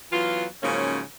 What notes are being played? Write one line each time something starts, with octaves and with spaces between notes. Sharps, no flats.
E3 F#3 B3 F4
G#2 C#3 F3 F#3 A#3 C#4